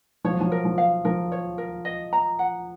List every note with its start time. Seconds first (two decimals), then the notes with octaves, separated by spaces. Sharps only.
0.24 F3 C#5
0.33 F#3
0.41 F3
0.52 A#4
0.65 F3
0.78 F5
1.05 F3 A#4
1.32 C#5
1.58 A#4
1.85 D#5
2.13 A#5
2.39 F#5